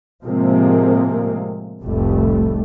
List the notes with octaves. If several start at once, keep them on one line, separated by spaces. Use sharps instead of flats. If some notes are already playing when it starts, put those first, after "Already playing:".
A2 C3 F3 G#3 A#3 C4
F1 C2 A2 G3 A3